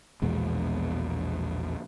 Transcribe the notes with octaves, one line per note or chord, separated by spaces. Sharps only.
A#1 E2 B2 G#3